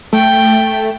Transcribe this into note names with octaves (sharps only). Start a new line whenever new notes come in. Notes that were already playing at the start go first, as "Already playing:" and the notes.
A3 G5